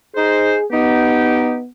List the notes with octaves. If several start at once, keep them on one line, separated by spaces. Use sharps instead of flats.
D#4 G#4 C5
B3 D#4 G4